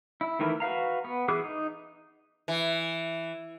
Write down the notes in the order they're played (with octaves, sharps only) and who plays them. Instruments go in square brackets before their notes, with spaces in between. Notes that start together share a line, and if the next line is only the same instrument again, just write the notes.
[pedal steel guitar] E4
D#3 E3 A3 E4 A#4
F#4 B4 F5 A#5
B3
E3 B3 G#4 D6 F#6
D#4
[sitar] E3